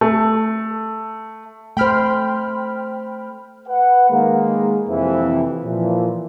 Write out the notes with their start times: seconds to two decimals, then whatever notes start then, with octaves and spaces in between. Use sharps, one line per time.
0.01 A3
1.77 A3 C5 G5 B5 F6
3.68 B4 F#5
4.10 D#3 G#3 A#3
4.88 F2 C3 E3
5.64 A#2 E3 F3